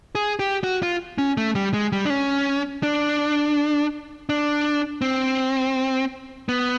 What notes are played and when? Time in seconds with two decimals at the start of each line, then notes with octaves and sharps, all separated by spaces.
0.15 G#4
0.39 G4
0.64 F#4
0.83 F4
1.18 C#4
1.37 A3
1.55 G3
1.74 G#3
1.92 G3
2.05 D4
2.10 C#4
2.83 D4
4.29 D4
5.01 C4
6.49 B3